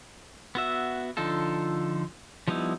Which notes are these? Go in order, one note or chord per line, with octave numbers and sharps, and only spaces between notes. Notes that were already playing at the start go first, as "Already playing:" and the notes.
B3 F#4 E5
D3 F3 D#4 F4 A4
F3 G3 B3 D#4 E4